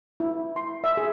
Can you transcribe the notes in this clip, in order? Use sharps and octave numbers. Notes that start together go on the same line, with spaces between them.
E4
C6
E5
G#4